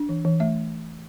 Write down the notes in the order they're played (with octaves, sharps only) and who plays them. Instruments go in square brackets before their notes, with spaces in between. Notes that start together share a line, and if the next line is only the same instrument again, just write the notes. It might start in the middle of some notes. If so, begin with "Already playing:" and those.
Already playing: [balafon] D4
E3
E3
A3 E5